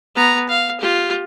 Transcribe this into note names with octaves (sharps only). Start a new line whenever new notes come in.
B3 A#5
F5
F4 G4